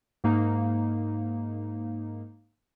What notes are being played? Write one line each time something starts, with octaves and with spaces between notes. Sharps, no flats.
G#2 A#3 D#4